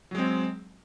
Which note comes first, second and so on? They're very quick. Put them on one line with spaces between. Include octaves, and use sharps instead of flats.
F#3 G#3 C4